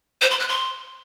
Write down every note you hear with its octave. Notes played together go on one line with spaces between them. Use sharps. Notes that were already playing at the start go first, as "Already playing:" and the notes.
C5
C6
F#6
C6